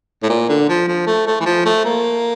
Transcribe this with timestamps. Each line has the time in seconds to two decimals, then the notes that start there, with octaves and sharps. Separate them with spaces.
0.23 A2
0.30 A#2
0.49 D3
0.69 F3
0.88 F3
1.07 A3
1.27 A3
1.40 E3
1.46 F3
1.66 A3
1.85 A#3